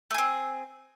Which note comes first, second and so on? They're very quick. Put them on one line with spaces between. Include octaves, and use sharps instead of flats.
A3 G#4 C4